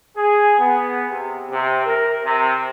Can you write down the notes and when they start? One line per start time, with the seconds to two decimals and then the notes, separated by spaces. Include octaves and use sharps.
0.16 G#4
0.58 B3
1.10 C3
1.51 C3
1.85 A#4
2.24 C3